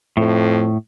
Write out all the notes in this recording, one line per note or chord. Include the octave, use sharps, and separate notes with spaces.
F2 A2